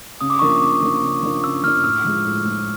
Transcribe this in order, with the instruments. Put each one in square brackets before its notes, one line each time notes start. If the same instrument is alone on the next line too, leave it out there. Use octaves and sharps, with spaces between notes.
[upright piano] C#3 [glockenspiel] D#6
[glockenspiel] D6
[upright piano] F3 A#3 D4 [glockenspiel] C#6
[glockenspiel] D6
[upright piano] C#3 [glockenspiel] D6
[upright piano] F3 A#3 D4
C#3
F3 A#3 D4
[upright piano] C#3 [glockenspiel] E6
[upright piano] F3 A#3 D4 [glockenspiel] F6
[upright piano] A2 [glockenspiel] E6
[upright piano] F3 G#3
A2
F3 G#3